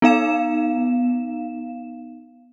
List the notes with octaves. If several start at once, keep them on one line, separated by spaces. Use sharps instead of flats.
B3 D#4 F5 E7